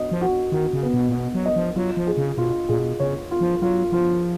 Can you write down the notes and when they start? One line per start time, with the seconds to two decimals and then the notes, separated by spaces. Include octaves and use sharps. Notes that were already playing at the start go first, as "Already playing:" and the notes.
Already playing: F#4 D#5
0.12 F3
0.21 F#4
0.52 D#3 F#4
0.73 C#3
0.83 B3
0.94 B2
1.09 A#2
1.14 B2 B3
1.34 F#3
1.46 D#5
1.56 F3
1.76 F#3 F4
1.97 F3
2.07 G#4
2.17 C#3
2.38 B2 F4
2.69 A#2 G#4
2.79 B2
3.00 C#3 C#5
3.31 F4
3.41 F3
3.62 F#3 F4
3.92 F3 F4